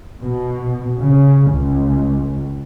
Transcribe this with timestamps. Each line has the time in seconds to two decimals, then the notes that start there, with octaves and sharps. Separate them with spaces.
0.21 B2
1.00 C#3
1.51 C#2